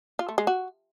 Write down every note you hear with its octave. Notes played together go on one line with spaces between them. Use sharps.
F4
A3
G#3
F#4